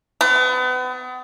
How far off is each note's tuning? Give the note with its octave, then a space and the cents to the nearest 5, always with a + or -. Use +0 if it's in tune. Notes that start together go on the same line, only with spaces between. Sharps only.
B3 +35